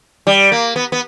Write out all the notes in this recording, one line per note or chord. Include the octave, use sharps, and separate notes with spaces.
G3
A#3
B3
B3